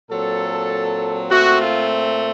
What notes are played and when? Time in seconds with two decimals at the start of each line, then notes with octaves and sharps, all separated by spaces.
0.10 A#2 F#3 C4 A4
1.30 A#2 A3 C4 F#4
1.60 F4